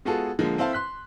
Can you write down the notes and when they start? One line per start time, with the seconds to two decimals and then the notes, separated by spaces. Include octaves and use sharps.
0.05 G#3 B3 F4 F#4 G#4 A4
0.39 D3 F3 G#3 A#3
0.58 C4 E4 A4 C5 F5 A5
0.73 C6 F#6 B6